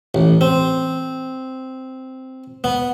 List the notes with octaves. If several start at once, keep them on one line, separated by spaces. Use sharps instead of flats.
A1
C4
B3